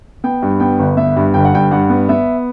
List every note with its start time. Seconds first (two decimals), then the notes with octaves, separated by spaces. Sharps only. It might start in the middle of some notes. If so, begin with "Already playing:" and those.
0.24 B3 G5
0.42 G2
0.60 B3 G5
0.79 G1
0.97 B3 E5
1.16 G2
1.34 G1 G5
1.45 F#5
1.54 G2 G5
1.71 G2 F#5
1.90 B3
2.09 B3 E5